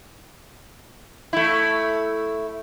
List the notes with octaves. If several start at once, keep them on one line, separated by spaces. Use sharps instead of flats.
A3 E4